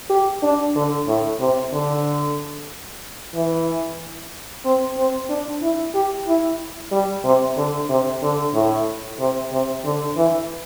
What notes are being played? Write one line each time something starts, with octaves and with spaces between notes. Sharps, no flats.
G4
D4
D3
A2
C3
D3
E3
C4
C4
D4
E4
G4
E4
G3
C3
D3
C3
D3
A2
C3
C3
D3
E3